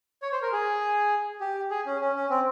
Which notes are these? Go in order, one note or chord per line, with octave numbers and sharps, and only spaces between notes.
C#5
C5
A#4
G#4
G4
G#4
C#4
C#4
C#4
C4